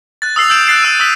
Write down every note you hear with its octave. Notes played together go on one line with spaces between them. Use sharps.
F#6 A6
D#6 E6 C7 F7
E6 G6 A6 D7 E7
F#6 A6 C7 D7 E7
E6 D#7
D#6 E6 B6